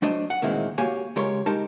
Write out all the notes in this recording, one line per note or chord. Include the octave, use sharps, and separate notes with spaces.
F#3 A3 D4 C5 D#5
F#5
D2 A#2 D#3 E3 G#3 C4
A#3 F#4 G4 C#5 F5 G#5
C#2 G#3 G4 A#4 C#5 C6
G#3 D#4 G4 A#4 A5